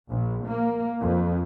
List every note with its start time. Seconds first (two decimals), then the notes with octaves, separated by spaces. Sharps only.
0.11 A#1
0.47 A#3
1.03 F2